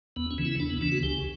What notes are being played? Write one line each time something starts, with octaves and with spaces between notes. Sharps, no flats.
E2 B3
C#4
C#3 E3
E4
E2 D4
B3
C#3 E3 D4
F#4
C#2 G4